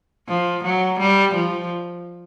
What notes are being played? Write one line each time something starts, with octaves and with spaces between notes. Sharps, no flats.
F3
F#3
G3
F3